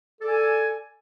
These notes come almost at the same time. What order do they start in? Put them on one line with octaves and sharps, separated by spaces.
A4 D5 G#5